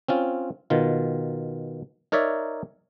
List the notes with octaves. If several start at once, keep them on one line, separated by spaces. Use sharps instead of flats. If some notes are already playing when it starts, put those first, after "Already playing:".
C4 C#4 F4
B2 D#3 F4
D#4 A#4 C#5 D5 E5